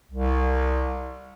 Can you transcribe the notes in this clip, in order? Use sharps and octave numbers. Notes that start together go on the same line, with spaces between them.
C2